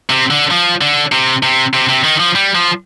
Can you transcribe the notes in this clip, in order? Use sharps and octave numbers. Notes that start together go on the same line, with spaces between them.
C3
D3
F3
D3
C3
C3
C3
C3
D#3
F3
G3
F3